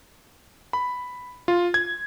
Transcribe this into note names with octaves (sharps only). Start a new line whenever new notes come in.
B5
F4
G#6